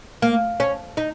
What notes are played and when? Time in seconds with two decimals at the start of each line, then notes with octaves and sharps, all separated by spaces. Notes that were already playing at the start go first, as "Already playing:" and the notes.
0.22 A#3
0.60 C#4
0.97 D#4